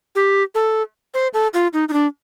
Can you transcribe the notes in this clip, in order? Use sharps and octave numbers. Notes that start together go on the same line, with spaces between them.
G4
A4
C5
A4
F4
D#4
D#4
D4